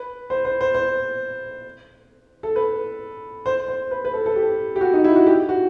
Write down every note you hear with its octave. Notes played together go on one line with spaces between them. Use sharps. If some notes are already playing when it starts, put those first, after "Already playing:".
Already playing: B4
C5
C5
C5
C5
A4
B4
C5
C5
B4
B4
A4
A4
G4
G4
F#4
D#4
E4
F#4
G4
F#4